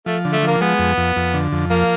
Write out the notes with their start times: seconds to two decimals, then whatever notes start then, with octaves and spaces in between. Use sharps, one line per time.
0.06 F3 A3
0.25 D3
0.33 A3
0.43 F3 A#3
0.61 G#3 B3
0.79 F2
0.97 F2
1.16 F2
1.34 D3
1.52 F2
1.70 F3 A#3